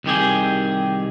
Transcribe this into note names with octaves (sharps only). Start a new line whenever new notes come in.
C2 D#3 G4 G#4